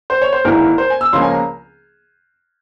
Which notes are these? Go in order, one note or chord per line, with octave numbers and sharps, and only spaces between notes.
C5
C#5
C5
G#1 G#2 E3 A#3 E4 A#4
C5
G#5
E6
C#2 C#3 F3 A#3 C#4 C6
G#5
A#5